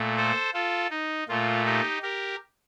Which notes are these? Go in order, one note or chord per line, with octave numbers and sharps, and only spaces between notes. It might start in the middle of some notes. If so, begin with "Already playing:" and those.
Already playing: A#2 A3
A4 C5
F4 A4
D#4
A#2 A3 F4
D#4 G4
G4 A#4